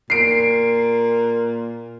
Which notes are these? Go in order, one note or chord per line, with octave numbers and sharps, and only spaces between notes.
A#2 C7 D7